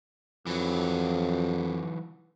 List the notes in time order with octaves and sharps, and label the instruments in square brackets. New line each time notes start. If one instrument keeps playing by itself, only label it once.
[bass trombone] F2 [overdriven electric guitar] E3 F#3